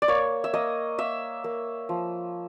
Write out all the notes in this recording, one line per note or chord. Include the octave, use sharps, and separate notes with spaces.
D5
A#3 C#5
E5
A#3 D#5
A#3 E5
A#3
F3